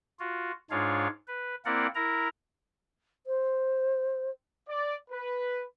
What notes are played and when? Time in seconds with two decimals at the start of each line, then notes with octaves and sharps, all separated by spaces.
0.20 F4 F#4
0.71 G#2 G#3 D4 F4 C#5 F5
1.28 B4
1.65 A#3 C4 E4 A#4 D5 F#5
1.95 E4 A#4 A#5
3.27 C5
4.68 D5
5.10 B4